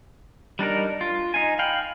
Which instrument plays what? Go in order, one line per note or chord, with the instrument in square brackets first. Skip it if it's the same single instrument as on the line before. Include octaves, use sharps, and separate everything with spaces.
[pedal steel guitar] G3 D4 D#4 A#4
F4
D#4 F5 G#5
F5 G5 B5